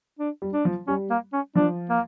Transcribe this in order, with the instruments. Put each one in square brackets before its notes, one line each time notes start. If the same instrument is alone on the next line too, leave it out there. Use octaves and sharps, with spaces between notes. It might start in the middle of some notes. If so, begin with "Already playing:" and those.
[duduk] D4
[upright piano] G3
[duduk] D4
[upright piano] F3
[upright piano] G3 [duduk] C#4
[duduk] A#3
C#4
[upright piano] F3 [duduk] D4
[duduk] A#3